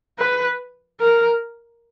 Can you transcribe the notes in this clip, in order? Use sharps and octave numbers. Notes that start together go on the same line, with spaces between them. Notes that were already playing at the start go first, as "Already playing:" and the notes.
B4
A#4